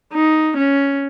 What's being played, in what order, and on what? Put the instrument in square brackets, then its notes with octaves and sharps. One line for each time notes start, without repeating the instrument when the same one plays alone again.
[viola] D#4
C#4